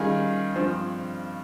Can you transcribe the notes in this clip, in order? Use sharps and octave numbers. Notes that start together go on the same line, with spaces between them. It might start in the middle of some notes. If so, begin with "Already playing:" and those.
Already playing: D#3 G3 C#4 F4 G#4
G2 F3 C4